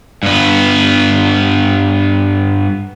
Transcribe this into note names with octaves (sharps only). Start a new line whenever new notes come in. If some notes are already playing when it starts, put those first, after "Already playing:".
G2 B3